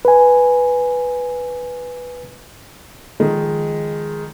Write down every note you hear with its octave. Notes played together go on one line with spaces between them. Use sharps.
B4 G#5
D#3 F3 G#3